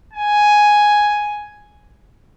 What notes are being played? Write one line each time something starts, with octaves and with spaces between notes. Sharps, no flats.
G#5